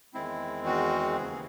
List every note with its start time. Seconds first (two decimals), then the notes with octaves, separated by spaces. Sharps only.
0.14 E2 D#3 G#3 C4 E4
0.66 F#4
1.17 D#2 C#3 E3 G#4